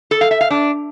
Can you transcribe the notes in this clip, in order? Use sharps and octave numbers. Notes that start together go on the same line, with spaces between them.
A4
F5
E5
F5
D4